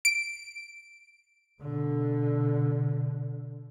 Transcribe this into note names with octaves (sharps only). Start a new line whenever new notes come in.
D7
B2 D3